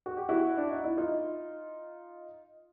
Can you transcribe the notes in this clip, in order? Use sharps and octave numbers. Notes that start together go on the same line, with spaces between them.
F#4
G4
E4 F#4
D4
D#4
E4
D#4 F4